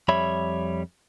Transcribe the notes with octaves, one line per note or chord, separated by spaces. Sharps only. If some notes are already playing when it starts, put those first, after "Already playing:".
F2 G3 C#5 E5 B5